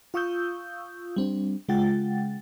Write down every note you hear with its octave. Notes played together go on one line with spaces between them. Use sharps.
F4 F5 C#6 D#6 E6 G6
G3 C4 D4
C#3 G#3 F4 F#5 G5 A6